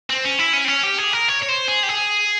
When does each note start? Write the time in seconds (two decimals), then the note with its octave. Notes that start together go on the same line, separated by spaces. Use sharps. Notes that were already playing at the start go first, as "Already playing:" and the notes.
0.10 C4
0.25 C#4
0.39 E4
0.53 C#4
0.65 C4
0.68 C#4
0.84 G4
0.98 G#4
1.13 A#4
1.28 C#5
1.42 C#5
1.48 C5
1.68 G#4
1.83 G4
1.89 G#4